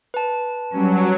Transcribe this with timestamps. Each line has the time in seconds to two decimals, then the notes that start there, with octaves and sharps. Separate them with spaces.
0.14 B4 A5
0.72 F#3 G3 C#4